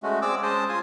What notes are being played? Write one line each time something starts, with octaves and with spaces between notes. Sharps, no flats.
G#3 A3 C#4 F#4
C4 G#4 D5 D6 E6
G#3 C#4 C5 D#5 A5 D#6
F4 G#5 D#6